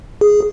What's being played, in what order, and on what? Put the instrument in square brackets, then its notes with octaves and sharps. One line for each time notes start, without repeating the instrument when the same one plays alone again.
[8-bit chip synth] G#4